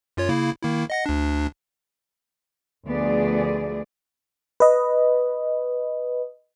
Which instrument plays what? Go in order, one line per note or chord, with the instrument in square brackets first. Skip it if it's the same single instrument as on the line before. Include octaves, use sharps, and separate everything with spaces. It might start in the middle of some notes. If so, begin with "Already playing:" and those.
[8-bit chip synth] F#2 F4 C#5
C#3 A#3 E4
D#3 A#3 E4
D#5 F#5 A#6
D2 D4
[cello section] D2 F3 A3 B3 G#4 D5
[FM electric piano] B4 D#5